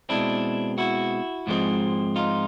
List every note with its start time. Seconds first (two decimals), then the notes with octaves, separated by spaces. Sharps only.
0.09 B2 G#3 C4 D4 E4
0.78 E4 F#4
1.47 G#2 F3 G#3 C4
2.16 D#4 F4